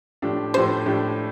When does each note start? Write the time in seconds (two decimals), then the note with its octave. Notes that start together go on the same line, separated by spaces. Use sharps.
0.22 A2 F3 A3 D4 G4
0.54 A2 F3 A3 D4 G4 C5
0.86 A2 F3 A3 D4 G4